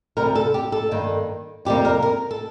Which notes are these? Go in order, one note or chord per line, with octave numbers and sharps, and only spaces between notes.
D2 C3 G3 A#4
A4
G4
A4
G2 D#3 A#3
F2 C3 D#3 G3 A#3 G4
A#4
A#4
A4